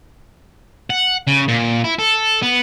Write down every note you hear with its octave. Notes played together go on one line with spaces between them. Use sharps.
F#5
C#3
A#2
E4
A4
B3